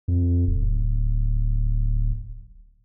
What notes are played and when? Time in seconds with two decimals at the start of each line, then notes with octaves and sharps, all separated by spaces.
0.08 F2
0.47 D1